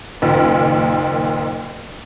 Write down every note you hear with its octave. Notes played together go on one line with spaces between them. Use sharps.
F#1 D#2 A#2